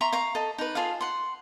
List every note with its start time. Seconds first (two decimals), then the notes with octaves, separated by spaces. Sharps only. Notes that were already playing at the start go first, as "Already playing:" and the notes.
0.01 E5 A#5 C6 C#6
0.13 F5 A#5 C#6
0.35 A4 D#5
0.58 D#4 B4
0.75 F4 G#4 A4 F5
1.01 F#5 C6